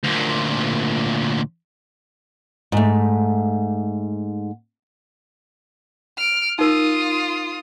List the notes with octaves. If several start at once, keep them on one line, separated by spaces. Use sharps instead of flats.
D2 A#2
G#2 A3
F6 D7
D#4 F4 A#4 D#6